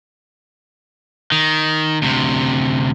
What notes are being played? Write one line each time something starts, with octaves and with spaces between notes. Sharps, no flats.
D#3
D2 C3